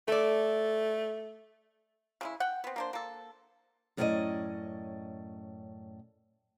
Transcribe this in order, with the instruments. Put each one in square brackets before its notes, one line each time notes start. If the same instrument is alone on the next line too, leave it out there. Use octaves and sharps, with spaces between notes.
[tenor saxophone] A3 [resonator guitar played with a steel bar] A4 D5
[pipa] C#3 G#3 E4
F#5 G5
B3 C4
A#3 D4 C5
A#3 A4
[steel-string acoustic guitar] F#2 A2 C#4 F#4 D5 D#5